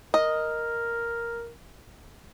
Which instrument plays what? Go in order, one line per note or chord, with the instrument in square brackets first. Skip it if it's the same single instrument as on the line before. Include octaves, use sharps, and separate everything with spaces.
[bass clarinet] A#4 [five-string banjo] D#5